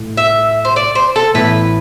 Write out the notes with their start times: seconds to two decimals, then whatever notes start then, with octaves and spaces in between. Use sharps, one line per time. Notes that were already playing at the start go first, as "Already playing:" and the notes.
Already playing: A2
0.17 E5
0.65 C5
0.76 D5
0.95 C5
1.16 A4
1.34 A2 E3 B3 E4 B4